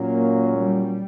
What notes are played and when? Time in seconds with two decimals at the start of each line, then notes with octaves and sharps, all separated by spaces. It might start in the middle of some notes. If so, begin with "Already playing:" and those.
Already playing: A#2 F#3 A#3 C#4
0.57 G3